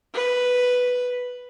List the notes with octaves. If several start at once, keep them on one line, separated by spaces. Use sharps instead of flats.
B4